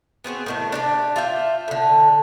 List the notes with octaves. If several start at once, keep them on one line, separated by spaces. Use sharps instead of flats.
B3 C4 F#4 G#4
A2 D#3 A3
D4 G4 D5
F4 E5 G5
A2 D3